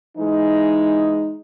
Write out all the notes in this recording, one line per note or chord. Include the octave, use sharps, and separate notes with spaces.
E3 G#3 D#4